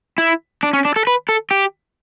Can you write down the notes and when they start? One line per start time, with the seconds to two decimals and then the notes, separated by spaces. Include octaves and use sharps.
0.18 E4
0.63 D4
0.73 C#4
0.85 D4
0.96 A4
1.07 B4
1.29 A4
1.51 G4